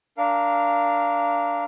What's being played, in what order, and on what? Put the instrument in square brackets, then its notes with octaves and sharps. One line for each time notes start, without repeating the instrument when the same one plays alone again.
[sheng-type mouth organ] D4 A#4 F5